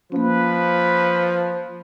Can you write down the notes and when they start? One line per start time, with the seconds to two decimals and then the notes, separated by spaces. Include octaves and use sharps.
0.12 F3 A#3 C#4 B4